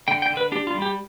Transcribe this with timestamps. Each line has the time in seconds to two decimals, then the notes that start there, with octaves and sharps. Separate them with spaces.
0.08 D3 G5
0.22 G5
0.30 D3
0.37 B4
0.52 D4 G4
0.67 F4
0.74 G3
0.82 G4